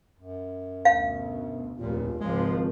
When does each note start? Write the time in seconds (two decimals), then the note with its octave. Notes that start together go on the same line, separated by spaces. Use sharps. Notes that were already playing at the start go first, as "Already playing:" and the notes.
0.20 F#2
0.85 D2 B2 F5
1.79 F1 A#1 D#2 A#2 F4
2.21 G#1 C#2 F3 G#3